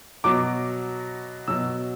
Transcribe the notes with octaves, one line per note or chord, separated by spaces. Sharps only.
B2 F#3 D6
B2 F#3 E6